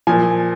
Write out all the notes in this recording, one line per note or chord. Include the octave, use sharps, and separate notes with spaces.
A#2 F3 G#5